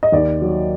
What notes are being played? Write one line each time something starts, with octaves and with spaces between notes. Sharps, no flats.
D#5
D#2 D5
F#3